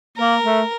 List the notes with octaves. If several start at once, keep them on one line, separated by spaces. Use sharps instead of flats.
A#3 A#4
A3